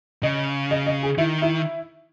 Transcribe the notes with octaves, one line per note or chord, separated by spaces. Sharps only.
C#3 D#5
D#5
D#5
G#4
D#3 E4
E4